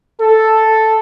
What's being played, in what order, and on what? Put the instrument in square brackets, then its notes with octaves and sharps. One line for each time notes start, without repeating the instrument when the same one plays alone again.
[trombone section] A4